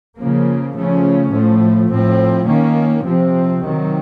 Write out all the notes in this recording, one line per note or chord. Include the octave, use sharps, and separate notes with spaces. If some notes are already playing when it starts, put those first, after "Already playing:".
C#3 F3 A#3
C#3 F3 A3 C#4
A2 F3 A3
A2 F3 C4
D#3 A#3 C#4
C3 F3 C4
C3 D#3 F#3